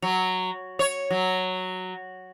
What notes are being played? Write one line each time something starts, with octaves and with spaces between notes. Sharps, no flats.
F#3
C#5
F#3